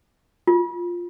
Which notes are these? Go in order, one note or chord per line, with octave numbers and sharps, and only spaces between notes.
F4